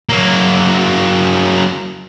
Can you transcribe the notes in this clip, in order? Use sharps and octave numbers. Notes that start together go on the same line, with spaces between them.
F#3 A#3